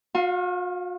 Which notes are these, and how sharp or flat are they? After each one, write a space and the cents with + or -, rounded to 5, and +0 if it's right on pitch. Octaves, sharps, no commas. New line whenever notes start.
F#4 -45 F5 +5